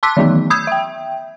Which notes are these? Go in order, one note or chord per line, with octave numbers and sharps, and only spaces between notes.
A5 C6 D6 E6 F#6 B6
D#3 E3 F#3 A3 B3 D#4
B5 D#6 E6 G6 G#6
E5 G5